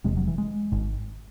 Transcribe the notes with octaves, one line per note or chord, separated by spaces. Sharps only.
E1 E2 C3 G#3
F#3
E3
G#3
G#1 G#2